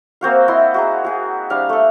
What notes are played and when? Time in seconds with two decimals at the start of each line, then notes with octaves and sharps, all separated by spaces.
0.21 A#3 C4 F#4 F5
0.48 E4 D#5 F#5 C6
0.74 F#4 G#4 A#5
1.04 F#4 G#4
1.50 G3 D4 F5
1.69 A3 A4